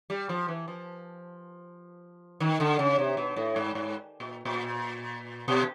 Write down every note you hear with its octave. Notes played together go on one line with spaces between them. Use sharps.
G3
F3
E3
F3
D#3
D3
C#3
C3
B2
A2
G#2
G#2
A#2
A#2
B2